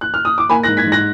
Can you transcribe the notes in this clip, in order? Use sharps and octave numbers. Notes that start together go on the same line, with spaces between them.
F#6
F6
D#6
D6
A#3 G#5 B5
F#6 A#6
G#2
G#6 B6
G#2
F#6 A#6